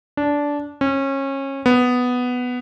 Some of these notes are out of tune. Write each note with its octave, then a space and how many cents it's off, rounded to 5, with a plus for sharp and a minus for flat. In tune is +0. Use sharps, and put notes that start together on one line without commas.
D4 -15
C#4 -25
B3 +5